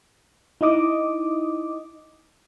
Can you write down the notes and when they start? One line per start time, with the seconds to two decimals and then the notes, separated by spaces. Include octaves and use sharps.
0.61 D#4 E4 D#5 D6 D#6